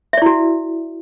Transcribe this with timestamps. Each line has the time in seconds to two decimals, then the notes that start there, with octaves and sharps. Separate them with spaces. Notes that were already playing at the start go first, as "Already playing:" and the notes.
0.13 E5
0.18 D5
0.22 E4
0.26 F#4